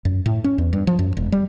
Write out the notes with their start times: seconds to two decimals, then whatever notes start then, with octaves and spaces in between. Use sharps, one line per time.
0.05 F#2
0.26 A2
0.44 C#4
0.58 E2
0.73 G2
0.87 F3
0.99 F#2
1.17 E1
1.32 G3